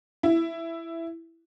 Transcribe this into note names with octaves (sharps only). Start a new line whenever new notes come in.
E4